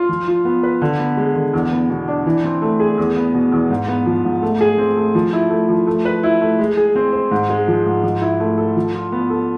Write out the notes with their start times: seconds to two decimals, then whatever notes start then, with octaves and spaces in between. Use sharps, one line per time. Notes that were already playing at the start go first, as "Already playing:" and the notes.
Already playing: F4
0.09 F3
0.27 F4
0.45 B3
0.63 B4
0.82 D3
0.99 B3
1.17 G#3
1.36 D3
1.53 E2
1.71 B3
1.90 B2
2.08 D4
2.26 E3
2.44 C4
2.62 A3
2.80 G#4
2.98 E2
3.16 B3
3.34 B2
3.52 E2
3.70 G#2
3.88 B3
4.06 F3
4.24 G#2
4.42 A3
4.61 G#4
4.78 C4
4.96 A3
5.15 F3
5.33 E4
5.50 A3
5.69 F3
5.87 A3
6.05 B4
6.23 E4
6.41 A3
6.59 G#3
6.77 G#4
6.95 C4
7.13 C5
7.31 G#2
7.49 G#3
7.68 F3
7.86 G#2
8.03 F3
8.21 E4
8.40 A3
8.58 A4
8.76 F3
8.94 F4
9.12 B3
9.30 A4